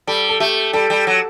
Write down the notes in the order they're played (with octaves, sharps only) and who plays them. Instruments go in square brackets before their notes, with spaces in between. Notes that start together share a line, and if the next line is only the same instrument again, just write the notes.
[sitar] G3 [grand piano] A4
[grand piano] A4
[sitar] A3 [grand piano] G4
[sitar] G3 [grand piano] A4
[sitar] G3
F#3